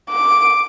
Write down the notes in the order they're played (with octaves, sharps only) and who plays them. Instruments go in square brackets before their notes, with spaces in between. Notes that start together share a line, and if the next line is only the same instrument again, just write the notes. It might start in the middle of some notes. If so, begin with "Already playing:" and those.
[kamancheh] D6